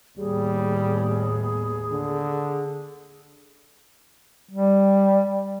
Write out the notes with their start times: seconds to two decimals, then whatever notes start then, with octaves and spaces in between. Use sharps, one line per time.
0.18 D#2 A2 G3 B3 G#4
1.91 D3
4.51 G3